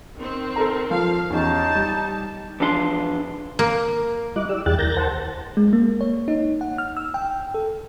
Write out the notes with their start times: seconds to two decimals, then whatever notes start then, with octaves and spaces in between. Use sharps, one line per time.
0.17 D#3 C4
0.56 A4 A#4 A#5
0.91 F3 F5
1.30 E2 C#4 D#4 G4 A5
1.75 G3
2.60 E2 F3 D4 F5 C6
3.59 A#3
4.36 G3 E4 D#5 D6 F#6
4.49 G4 D5 E6
4.66 E2 E4 G#4 G5 F#6 A6
4.79 D#2 A#4 G6 A6 A#6
4.97 C5 F#5 A5
5.57 G#3
5.73 A#3
6.01 C#5
6.28 D#4
6.61 F#5
6.78 F6
6.97 E6
7.14 G5
7.54 A4